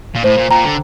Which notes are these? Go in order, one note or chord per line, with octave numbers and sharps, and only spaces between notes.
A#2
A2 C5
A#2
A#2 G5 A#5
D3